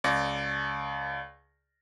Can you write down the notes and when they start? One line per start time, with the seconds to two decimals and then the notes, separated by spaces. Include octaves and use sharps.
0.04 C#2 D5 D6 A#6